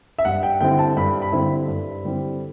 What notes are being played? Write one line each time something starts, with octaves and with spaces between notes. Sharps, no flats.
E5
G2 F#5
G5
D3 G3 C4 E4 G5
A5
G2 B5
B5
D3 G3 C4 E4
G2
D3 G3 C4 E4